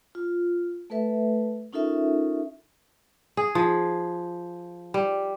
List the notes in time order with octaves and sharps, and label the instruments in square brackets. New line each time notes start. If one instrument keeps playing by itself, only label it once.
[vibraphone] F4
A3 A4 B4 E5
C#4 D#4 F4 A4 A#4 E5
[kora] G#4
F3
G3